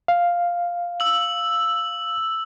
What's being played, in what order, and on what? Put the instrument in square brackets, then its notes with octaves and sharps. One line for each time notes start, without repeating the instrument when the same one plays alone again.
[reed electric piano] F5
[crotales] E6 F#7